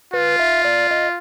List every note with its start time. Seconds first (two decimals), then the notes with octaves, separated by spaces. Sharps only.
0.13 F4 B4
0.40 E5
0.65 D5
0.91 D#5